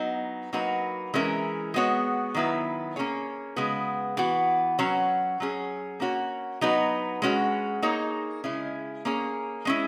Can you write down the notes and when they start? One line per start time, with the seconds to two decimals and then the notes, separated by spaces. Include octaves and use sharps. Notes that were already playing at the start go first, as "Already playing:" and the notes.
Already playing: F#3 B3 D#4
0.53 F#3 A#3 D#4 F#4 B4
1.14 E3 G#3 C#4 E4 A#4
1.74 G#3 B3 F#4 C#5
2.35 D#3 F#3 B3 E4 B4
2.96 A#3 C#4 G#4 C#5
3.56 C#3 G#3 B3 F#4 B4
4.17 E3 B3 F#4
4.79 F#3 C#4 F#4 C#5
5.40 F#3 C#4 G#4
6.00 A#3 C#4 F#4 C#5
6.61 F#3 B3 D#4 F#4 B4
7.22 G#3 C#4 F#4 C#5
7.82 A#3 D#4 G#4 C#5
8.44 C#3 G#3 C#4 E4
9.05 A#3 C#4 G#4 C#5
9.65 G#3 C#4 E4